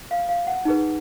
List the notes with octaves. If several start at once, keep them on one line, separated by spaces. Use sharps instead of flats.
F5
F5
F#5
D#4 G#4 B4